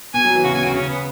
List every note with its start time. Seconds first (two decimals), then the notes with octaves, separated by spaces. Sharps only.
0.14 B2 G#5
0.25 F#3
0.35 E3
0.44 C#3 F#4
0.55 B2 G#5
0.64 C#3 F#4
0.74 C#3 C#4
0.90 B3